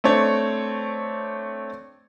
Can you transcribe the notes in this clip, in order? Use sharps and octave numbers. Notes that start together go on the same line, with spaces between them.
A3 C4 D4 C#5